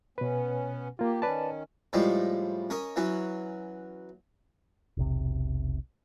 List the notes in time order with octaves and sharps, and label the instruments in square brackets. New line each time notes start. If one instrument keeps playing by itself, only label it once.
[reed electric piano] B2 B4 [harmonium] B3 C#4
[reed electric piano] A#3 F4 [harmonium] G4
[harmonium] D#3 C#4 [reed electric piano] B4 D5 A5
[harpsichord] A2 F3 G3 G#3
C#4 A#4 D#5
E3 F#3 C#4
[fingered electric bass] E1 B1 C3